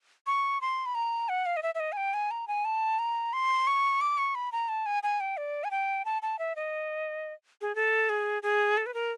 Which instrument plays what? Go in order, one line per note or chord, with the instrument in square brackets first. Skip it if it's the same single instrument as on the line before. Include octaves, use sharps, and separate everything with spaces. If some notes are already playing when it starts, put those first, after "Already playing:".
[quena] C#6
C6
B5
A#5
F#5
F5
D#5
E5
E5
D#5
G#5
G5
G#5
A#5
G#5
A5
A#5
C6
C#6
D6
C#6
B5
A#5
A5
G#5
G#5
G5
D5
G#5
G5
A5
A5
E5
D#5
G#4
A4
G#4
G#4
A4
B4
A#4